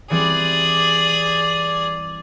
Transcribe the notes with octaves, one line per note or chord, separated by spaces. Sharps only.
E3 G3 C4 G#4 D5